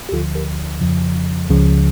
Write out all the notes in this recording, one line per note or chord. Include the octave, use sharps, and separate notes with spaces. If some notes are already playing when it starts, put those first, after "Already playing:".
G4
D2 D3 F3 F4 A4
G4 A#4
F2 C#3 F3
C#2 C#3 F3